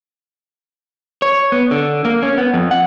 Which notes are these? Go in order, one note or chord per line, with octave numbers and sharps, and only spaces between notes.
C#5
B3
D3
A#3
C#4
B3
F2
F#5